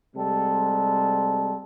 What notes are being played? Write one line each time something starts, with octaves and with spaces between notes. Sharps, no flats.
C3 G3 G#3 A4